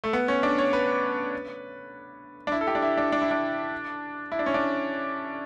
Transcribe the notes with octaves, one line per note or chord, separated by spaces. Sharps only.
A3
B3
C#4
D4
C#5
B4
D4
E4
A4
G4
D4
E4
D4
D4
E4
D4
E4
D4
C#4
D4